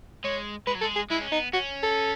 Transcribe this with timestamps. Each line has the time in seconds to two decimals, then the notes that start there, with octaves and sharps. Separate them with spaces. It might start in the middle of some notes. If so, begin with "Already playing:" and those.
0.24 G#3 C#5
0.67 G#3 B4
0.75 F#3
0.81 G#3 A4
0.96 G#4
1.10 G#3 E4
1.21 C#4
1.32 B3 D#4
1.53 C#4 F#4
1.83 A4